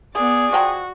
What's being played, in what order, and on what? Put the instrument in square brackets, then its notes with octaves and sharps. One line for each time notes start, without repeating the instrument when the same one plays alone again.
[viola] B3 D5 [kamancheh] G#4
[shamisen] F3 G5 A#5 [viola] F#4